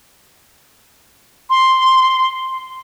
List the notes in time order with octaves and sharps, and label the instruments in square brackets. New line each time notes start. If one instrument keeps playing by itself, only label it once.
[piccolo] C6